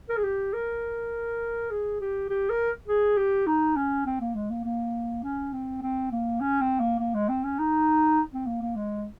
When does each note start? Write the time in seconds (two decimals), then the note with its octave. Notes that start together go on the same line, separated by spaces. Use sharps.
0.09 A#4
0.17 G#4
0.24 G4
0.53 A#4
1.70 G#4
2.01 G4
2.30 G4
2.49 A#4
2.88 G#4
3.17 G4
3.46 D#4
3.76 C#4
4.06 C4
4.21 A#3
4.35 G#3
4.50 A#3
4.64 A#3
5.23 C#4
5.53 C4
5.82 C4
6.12 A#3
6.40 C#4
6.61 C4
6.80 A#3
6.99 A#3
7.14 G#3
7.29 C4
7.44 C#4
7.59 D#4
8.32 C4
8.46 A#3
8.62 A#3
8.76 G#3